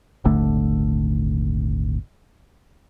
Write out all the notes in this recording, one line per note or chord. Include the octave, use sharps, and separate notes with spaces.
D#1 G#1 D3 A3